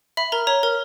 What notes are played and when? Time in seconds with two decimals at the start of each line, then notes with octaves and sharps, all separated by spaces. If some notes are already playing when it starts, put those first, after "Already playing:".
0.17 E5 B5
0.32 A#4 A#5
0.47 C#5 A#5
0.63 A#4